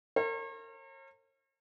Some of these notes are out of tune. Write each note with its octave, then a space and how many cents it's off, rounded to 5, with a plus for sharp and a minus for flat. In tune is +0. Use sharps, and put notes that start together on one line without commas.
A#4 -35 C#5 -45